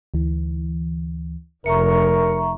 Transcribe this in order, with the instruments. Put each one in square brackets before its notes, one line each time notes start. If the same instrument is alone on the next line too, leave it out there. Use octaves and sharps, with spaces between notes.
[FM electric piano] D2 E3
[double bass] F1 [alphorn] A#4 [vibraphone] E5 A#5 C#6 [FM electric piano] C#7